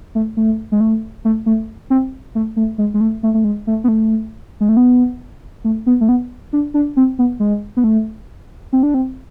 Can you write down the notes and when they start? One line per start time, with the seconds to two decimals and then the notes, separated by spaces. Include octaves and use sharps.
0.15 A3
0.37 A3
0.72 G#3
0.80 A3
1.25 A3
1.46 A3
1.90 C4
2.35 A3
2.56 A3
2.78 G#3
2.94 G#3
3.01 A3
3.23 A3
3.34 A3
3.44 G#3
3.67 A3
3.84 B3
3.88 A3
4.61 G#3
4.69 A3
4.77 B3
5.64 A3
5.86 B3
6.01 A3
6.09 B3
6.53 D4
6.74 D4
6.97 C4
7.19 B3
7.40 G#3
7.77 B3
7.84 A3
8.73 C4
8.83 D4
8.94 C4